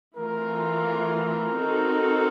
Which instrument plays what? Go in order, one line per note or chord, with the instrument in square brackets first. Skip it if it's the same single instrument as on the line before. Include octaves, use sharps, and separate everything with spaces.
[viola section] E3 A3 C4 F4 [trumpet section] A#4
[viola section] C4 D#4 F#4 A4